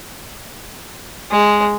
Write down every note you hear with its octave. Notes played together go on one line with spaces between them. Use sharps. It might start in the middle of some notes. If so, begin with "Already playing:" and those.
G#3